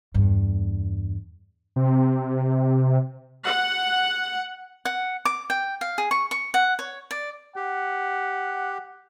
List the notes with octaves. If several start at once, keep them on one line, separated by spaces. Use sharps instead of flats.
E2 G2
C3
F#5
F#5
D6
G5
F5
G#4
C#6
C#6
F#5
C#5
D5
G4 F#5